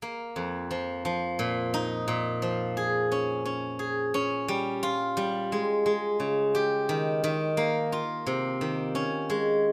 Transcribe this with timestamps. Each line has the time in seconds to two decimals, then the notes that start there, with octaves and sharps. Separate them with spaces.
0.02 A#3
0.36 F2
0.71 F3
1.05 F3
1.39 A#2
1.74 D#4
2.08 A#2
2.42 F3
2.77 G#4
3.12 C#4
3.45 C#4
3.79 G#4
4.14 C#4
4.48 G3
4.83 F4
5.17 G3
5.52 G#3
5.86 G#3
6.20 C#3
6.55 G4
6.89 D#3
7.24 D#3
7.57 A#3
7.92 F4
8.26 C3
8.61 D#3
8.95 C#4
9.30 G#3